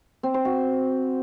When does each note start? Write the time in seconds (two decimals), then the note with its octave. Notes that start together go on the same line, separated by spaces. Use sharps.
0.23 C4
0.34 C5
0.45 F#4